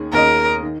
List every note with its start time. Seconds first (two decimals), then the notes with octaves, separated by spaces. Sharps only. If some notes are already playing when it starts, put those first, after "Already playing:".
Already playing: D#2 D#3 C#4 G#4
0.13 D#2 D#3 C#4 G#4 A#4 D#5
0.62 D#3